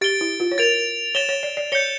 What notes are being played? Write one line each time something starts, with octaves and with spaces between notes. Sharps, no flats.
G4 A6 D7 G7
E4
F4
C#5
A#4 A6 D7 F7
C#5 A6 E7 G7
C#5
D5
D5
C#5 G6 C#7 G7